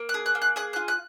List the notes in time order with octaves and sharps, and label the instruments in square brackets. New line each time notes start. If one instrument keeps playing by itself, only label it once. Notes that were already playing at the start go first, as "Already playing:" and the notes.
Already playing: [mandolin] A#3
F#6
G#4
F#6
A#3
F#6
G#4 F#6
F4 F#6
F#6